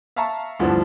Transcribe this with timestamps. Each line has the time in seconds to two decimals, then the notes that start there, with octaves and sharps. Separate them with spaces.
0.16 E5 F5 A5 A#5 C#6
0.59 D2 G2 E3 F3 B3 D4